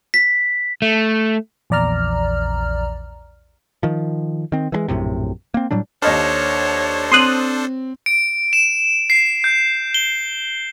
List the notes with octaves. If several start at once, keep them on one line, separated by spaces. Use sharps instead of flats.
B6
A3
A#1 E2 D5 A#5 F6
D#3 F3
D#3 C4
E3 F3 G#3
A#1 F#2 A2 C3
A#3 C4
A2 F#3 G3 D4
D#2 D4 A4 C5 C#5 D#5 F6
C4 C6 D#6 F#6
D7
E7
C7
G6
G7